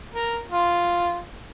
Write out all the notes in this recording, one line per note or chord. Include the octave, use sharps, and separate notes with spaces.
A#4
F4